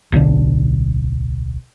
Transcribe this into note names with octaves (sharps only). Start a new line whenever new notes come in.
D1 B1 D3 D4